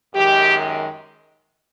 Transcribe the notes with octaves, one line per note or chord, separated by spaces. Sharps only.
F#2 D#3 G#3 G4